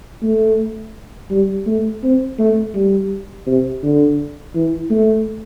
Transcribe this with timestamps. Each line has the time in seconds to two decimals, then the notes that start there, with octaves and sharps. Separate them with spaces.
0.23 A3
1.31 G3
1.67 A3
2.03 C4
2.38 A3
2.75 G3
3.47 C3
3.83 D3
4.55 E3
4.91 A3